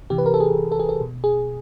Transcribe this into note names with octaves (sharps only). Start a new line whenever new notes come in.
C3 E3 G4
B4
A#4
A4
G#4
A4
G#4
A4
B2
G#4